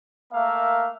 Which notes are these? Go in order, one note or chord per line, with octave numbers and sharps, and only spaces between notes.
A3 A#3 A#4 E5 F5